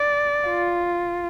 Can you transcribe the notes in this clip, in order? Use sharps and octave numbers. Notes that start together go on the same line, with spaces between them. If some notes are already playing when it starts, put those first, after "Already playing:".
Already playing: D5
F4